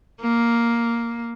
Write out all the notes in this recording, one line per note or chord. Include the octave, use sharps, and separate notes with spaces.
A#3